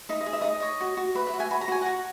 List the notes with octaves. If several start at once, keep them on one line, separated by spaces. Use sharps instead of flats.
D#4 E5
D#5
G#4
E5
D#4 D#5
C#5 D#5
F#4
F#4
B4 E5
E5
F#4
E5 G#5
F#4 B5
A#5
F#4 G#5
F#4 F#5 A#5